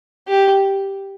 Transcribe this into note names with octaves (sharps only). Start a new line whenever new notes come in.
G4